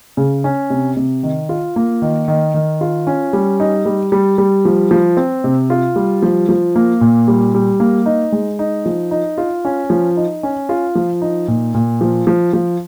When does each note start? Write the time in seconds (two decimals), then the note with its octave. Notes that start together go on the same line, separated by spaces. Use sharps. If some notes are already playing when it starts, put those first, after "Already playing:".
0.17 C#3
0.44 C#4
0.70 C3
0.97 C3
1.23 D#3
1.49 F4
1.76 A#3
2.02 D#3
2.28 D#3
2.54 D#3
2.81 F4
3.07 C#4
3.33 G3
3.60 D#4
3.86 G3
4.12 G3
4.38 G3
4.65 F3
4.91 F3
5.17 C4
5.44 C3
5.70 F4
5.96 G3
6.23 F3
6.49 F3
6.76 A#3
7.01 A#2
7.28 G3
7.54 G3
7.80 A#3
8.06 D#4
8.32 G#3
8.59 D#4
8.86 F3
9.11 D#4
9.38 F4
9.65 C#4
9.90 F3
10.17 D#4
10.43 C#4
10.69 F4
10.95 F3
11.22 D#4
11.48 A#2
11.74 A#2
12.01 F3
12.27 F3
12.53 F3